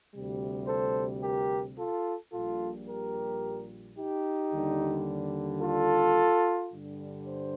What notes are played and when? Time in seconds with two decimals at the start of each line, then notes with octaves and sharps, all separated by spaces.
0.13 D2 C3 G3
0.67 A4 C5
1.22 G4 A#4
1.78 F4 A4
2.32 A#1 A#2 G3 F4 A4
2.87 G4 A#4
3.97 D#4 G4
4.52 D#2 D3 G3
5.61 F4 A4
6.72 G2 D3 G3
7.26 C5